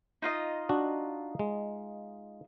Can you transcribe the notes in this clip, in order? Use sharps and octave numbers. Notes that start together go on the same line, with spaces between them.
D#4 F4 D#5
D4 F#4
G#3